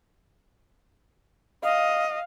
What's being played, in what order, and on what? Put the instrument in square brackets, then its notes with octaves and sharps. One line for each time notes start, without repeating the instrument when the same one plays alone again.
[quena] D#5 [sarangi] F5